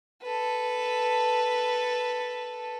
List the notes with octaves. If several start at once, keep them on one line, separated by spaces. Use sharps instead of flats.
A4 B4